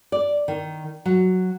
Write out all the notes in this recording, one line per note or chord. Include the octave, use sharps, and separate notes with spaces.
D5
D#3
F#3